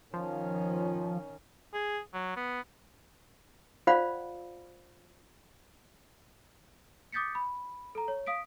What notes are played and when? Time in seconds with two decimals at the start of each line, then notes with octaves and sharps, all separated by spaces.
0.14 D#3 F3 C#4
1.74 G#4
2.14 F#3
2.36 B3
3.87 F4 C5 D5 F5 F#5 B5
7.12 D6 D#6 G6 A6 B6 C#7
7.35 B5
7.95 A4 A#5
8.08 C#5
8.27 F5 D#6 B6 D7